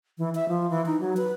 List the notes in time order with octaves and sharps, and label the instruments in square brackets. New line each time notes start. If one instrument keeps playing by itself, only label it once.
[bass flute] E3
E5
F3
E3
D#4
F#3
B4